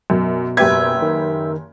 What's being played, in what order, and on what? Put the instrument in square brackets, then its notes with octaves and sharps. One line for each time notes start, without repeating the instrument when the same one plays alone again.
[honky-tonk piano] F#2 [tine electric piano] B2
[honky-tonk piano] F#1 G4 G#6 [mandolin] B4 E5
[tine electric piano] D#3